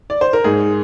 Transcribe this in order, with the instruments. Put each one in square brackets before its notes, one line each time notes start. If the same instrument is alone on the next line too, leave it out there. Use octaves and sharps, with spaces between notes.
[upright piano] D5
C5
A#4
G#2 G#4